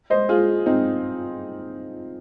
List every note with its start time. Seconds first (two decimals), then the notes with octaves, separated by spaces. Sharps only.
0.10 C5 D#5
0.29 F4 G#4
0.66 C4 D#4